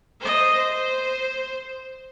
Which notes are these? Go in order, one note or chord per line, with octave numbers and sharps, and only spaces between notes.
C5 D#5
C5